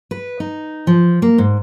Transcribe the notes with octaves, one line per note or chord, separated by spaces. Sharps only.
B4
D#4
F3
A#3
G#2